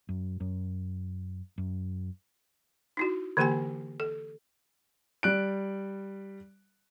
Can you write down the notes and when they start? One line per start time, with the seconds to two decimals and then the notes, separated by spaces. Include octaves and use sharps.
0.09 F#2
0.40 F#2
1.58 F#2
2.97 D#4 E4 F#4
3.37 D3 E3 A#3 G4 G5 G#5
4.00 A4
5.23 G3 F#6 D7